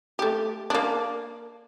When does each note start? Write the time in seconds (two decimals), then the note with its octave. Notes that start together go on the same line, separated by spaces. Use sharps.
0.19 A3 G4
0.70 A#3 D4